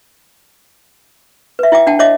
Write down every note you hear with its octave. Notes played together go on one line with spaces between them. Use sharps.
B4 E5
E4 E5 G5 D6
D4 F#5 G5 A5
C#5 D#5 E5 D6